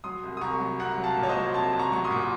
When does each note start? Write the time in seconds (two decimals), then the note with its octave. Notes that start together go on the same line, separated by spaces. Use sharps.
0.04 F#3 C6 D#6
0.24 C2
0.37 D#6
0.41 C2 A#5 C#6
0.60 F#3
0.79 C2 F#5 A#5
0.98 F#3
1.04 F5 A5
1.17 A#2
1.23 C#5
1.29 C5 D#5
1.35 F#3
1.54 C2 A5 C6
1.73 C2
1.79 A#5 C#6
1.92 F#3 C#6
2.04 C6 D#6
2.11 A#2